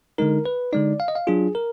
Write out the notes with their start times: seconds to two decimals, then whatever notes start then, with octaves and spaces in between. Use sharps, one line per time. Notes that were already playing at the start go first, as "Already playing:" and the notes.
0.18 D3 G#3 D#4 A#4
0.46 B4
0.73 D3 G#3 D#4 D5
1.00 F5
1.08 D#5
1.15 F5
1.27 F#3 D4 F4 G#4
1.55 A#4